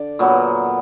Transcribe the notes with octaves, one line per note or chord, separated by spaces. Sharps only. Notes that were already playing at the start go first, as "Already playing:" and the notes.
Already playing: D3 D5
A#2 F#3 B3